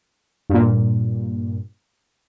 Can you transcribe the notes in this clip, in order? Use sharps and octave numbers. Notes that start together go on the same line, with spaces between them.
G2 A#2